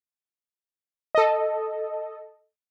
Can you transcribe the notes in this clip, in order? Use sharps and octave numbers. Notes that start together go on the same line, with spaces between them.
A4 D#5